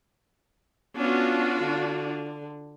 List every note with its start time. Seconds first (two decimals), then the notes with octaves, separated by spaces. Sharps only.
0.97 B3 C#4 D4 F4 F#4
1.60 D3